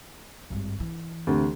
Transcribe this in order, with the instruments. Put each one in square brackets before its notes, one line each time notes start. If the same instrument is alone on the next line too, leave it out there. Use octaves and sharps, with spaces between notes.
[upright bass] G#1 G2
E3
[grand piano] D2 C3